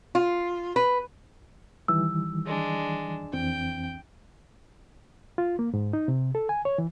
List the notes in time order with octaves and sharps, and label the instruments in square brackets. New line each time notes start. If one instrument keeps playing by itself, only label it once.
[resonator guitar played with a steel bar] F4
B4
[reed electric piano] D#3 E3 G3 [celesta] E6
[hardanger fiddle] G#3 D4
[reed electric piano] F2 E3 C4 [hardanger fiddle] G5
[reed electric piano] F4
A#3
G#2
D#4
C3
A4
G#5
C#5
E3